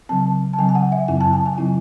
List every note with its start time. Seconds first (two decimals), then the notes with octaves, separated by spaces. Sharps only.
0.09 C#3 F#3 C4 A5
0.53 A5
0.59 C#3 F#3 C4 G#5
0.69 G#5
0.75 F#5
0.92 E5
1.08 F#2 C#3 F#3 C4 E4 G#5
1.21 A5
1.33 G#5
1.46 G#5
1.58 C#3 F#3 C4 E4